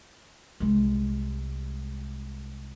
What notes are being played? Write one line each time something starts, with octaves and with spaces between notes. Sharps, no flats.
C2 G#3